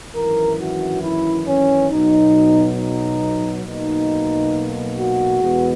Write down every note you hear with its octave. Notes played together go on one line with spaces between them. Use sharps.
G#1 F#2 E3 A#4
F#4
E4
C#4
B1 B2 F#3 D#4
D#4
B1 B2 A#3 D#4
F#4
E2 B2 G#3 B3